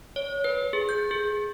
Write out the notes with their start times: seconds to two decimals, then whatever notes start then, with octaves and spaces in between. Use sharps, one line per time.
0.16 C#5
0.44 B4
0.73 G#4
0.89 G6
1.11 G#4